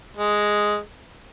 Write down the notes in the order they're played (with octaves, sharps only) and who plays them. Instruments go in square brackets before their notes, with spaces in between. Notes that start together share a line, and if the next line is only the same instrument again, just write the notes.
[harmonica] G#3